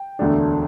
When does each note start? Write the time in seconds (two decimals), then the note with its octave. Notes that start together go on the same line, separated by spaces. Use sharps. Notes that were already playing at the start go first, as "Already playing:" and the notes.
Already playing: G5
0.19 E1 D2 D3 A3 D4